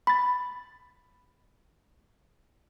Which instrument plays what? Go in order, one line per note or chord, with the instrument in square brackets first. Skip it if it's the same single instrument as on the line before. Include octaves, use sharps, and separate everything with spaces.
[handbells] B5 A6